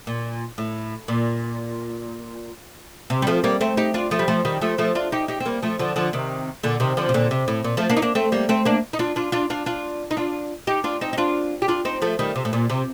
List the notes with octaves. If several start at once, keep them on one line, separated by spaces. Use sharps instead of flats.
A#2
A2
A#2
C3
G3
F3 A3
G3 A#3
A3 C4
D#4 G4
D4 F4
F3 A3
G3
F3 A3
D#3 G3
F3 A3
F3 A3
D4 F4
D#4 G4
D#4 G4
C4
G3 A#3
F3 A3
D3 F3
D3 F3
C3 D#3
A#2 D3
C3 D#3
D3 F3
C3
A#2 D3
C3
A2
A#2
F3 A3
A#3 D4
D#4
A#3 D4
A3 C4
G3 A#3
A3 C4
A#3 D4
D#4
D4 F4
D4 F4
D4 F4
D4 F4
D4 F4
D#4
D4 F4
D#4 G4
D4 F4
C4 D#4
D#4
D4 F4
G4
D4 F4
C4 D#4
F3 A3
D#3 G3
C3
A2
A#2
C3